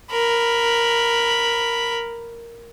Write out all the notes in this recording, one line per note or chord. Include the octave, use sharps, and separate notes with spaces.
A#4 B5